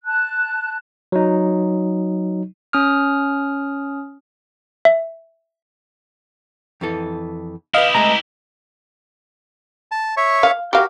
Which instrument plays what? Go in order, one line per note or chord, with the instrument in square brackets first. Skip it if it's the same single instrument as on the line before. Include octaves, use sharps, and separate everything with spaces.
[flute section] A5 F#6
[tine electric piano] F#3 D#4
[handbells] C#4 D#6 F6
E5
[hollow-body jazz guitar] F2 E3 A4
[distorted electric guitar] E4 G4 [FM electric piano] B4 D#5 [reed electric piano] F5
[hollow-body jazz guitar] G#3 A3 G#5 [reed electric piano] A#5
[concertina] A5
C#5 E5 C#6
[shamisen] F5
[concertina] F#4 A#4 [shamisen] G4 F5